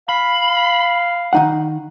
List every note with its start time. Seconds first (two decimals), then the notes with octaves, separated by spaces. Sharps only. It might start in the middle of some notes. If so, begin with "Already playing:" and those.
0.09 F5 B5
1.33 D#3 D#4 F#5